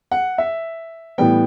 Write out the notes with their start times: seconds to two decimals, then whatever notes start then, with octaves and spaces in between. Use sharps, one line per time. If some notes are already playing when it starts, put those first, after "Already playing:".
0.12 F#5
0.38 E5
1.18 A2 E3 G3 B3 G5